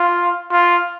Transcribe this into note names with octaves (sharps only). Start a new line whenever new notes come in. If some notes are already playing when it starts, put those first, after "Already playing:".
Already playing: F4
F4